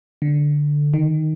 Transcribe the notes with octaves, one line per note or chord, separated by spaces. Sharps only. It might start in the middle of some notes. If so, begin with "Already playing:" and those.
D3
D#3